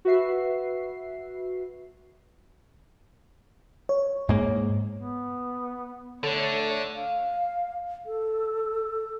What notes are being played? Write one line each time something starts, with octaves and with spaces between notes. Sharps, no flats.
F#4 B4 E5 C7
C#5
G#2 G#3 A#3
B3
D3 A3 A4 C#5
F5
A4